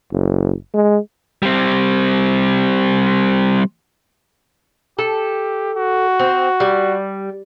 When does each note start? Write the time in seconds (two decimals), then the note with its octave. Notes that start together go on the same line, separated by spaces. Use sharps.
0.12 F#1
0.74 G#3
1.43 G3 C4
4.99 G4 A4
5.77 F#4
6.19 C4
6.60 G3